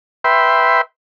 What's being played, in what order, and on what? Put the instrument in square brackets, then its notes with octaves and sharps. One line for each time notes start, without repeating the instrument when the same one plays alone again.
[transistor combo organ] B4 E5 G5 C6